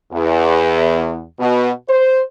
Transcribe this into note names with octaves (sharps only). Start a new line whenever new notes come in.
E2
B2
C5